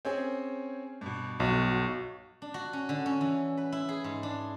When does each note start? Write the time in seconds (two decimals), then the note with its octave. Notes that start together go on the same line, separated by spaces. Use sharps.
0.05 C4 C#4 G#4
1.01 G2 B2
1.40 B1 F#4
2.42 D4
2.54 F#4
2.73 C#4
2.89 D3
3.06 C#4
3.21 E3
3.57 B4
3.72 E4
3.89 G#4
4.04 G#2
4.23 D4